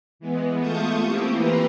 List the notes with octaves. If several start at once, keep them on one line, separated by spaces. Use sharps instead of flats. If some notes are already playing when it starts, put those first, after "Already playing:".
E3 G#3 B3
A3 F4 A5 C#6 D#6 G6
A#3 C4 E4 G4
E3 B4 A#5 C6